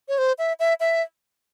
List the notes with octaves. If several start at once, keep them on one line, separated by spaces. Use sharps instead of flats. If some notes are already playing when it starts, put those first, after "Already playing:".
C#5
C5
E5
E5
E5